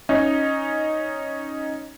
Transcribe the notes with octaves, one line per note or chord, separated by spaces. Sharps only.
C#4 D#4